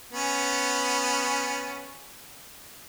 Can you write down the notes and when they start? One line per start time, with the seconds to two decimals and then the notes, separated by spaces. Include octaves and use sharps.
0.13 B3 C#4